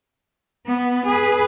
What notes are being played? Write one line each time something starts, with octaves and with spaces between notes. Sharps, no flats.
B3
G#4 B4